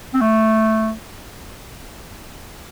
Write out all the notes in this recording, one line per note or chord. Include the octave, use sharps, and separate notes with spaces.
C4
A3